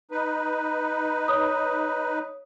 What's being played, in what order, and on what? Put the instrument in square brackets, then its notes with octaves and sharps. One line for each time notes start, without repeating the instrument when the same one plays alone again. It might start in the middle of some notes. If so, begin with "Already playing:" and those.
[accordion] D#4 B4
[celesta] C#5 D#6